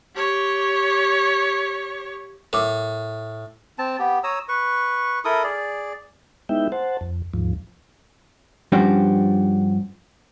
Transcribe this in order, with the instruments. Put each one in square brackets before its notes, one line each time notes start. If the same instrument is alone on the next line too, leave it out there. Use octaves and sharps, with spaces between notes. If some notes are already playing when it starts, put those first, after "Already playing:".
[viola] G4 C#5
[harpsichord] A2 [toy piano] A#4 D6
[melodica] C4 A5
B3 G4
C#5 A#5 D#6 E6
B4 C#6
E4 A4 A#4 D#6
G#4 D5
[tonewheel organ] G#3 B3 D#4 E4 E5 G5
C5 F#5 A5
F2
D#2 G#2 F3
[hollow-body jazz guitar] G2 F3 C#4 D4 F#4 G4